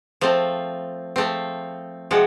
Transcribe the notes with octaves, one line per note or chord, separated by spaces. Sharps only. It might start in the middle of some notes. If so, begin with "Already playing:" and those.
F3 A3 C4
F3 A3 C4
C3 F3 G#3 F#4